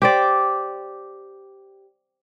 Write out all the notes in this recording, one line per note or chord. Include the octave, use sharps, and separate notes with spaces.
G4 C5 D5